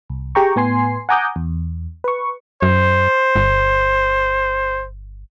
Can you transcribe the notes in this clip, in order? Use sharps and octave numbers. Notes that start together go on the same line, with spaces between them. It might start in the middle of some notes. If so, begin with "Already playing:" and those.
C2
G4 G#4 G5 A#5 C#6
A2 B3 G#5 C6 C7
F#5 G#5 A#5 D6 D#6 G6
E2
B4 C#6
F#2 C5
G1